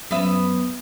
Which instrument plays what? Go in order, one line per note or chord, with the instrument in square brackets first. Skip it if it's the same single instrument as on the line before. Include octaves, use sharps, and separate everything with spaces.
[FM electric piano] F#2 [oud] B3 E5